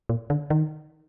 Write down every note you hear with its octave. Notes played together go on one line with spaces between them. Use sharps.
A#2
D3
D#3